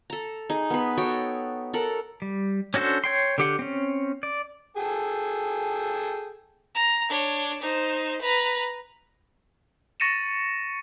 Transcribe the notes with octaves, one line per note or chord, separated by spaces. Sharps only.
A4 A#5
D#4 G#4
B3 B4
F#4 A4 C#5 G5
A4 A#4 F#5
G3
C#4 D4 F#4 A4 C5
C#5 G5 C6
D3 G4 F#5
C4 C#4
D5
G#4 A4 G5
A#5
D4 C#5
D#4 C5
B4 A#5
C#6 A6 A#6 C#7 D#7 E7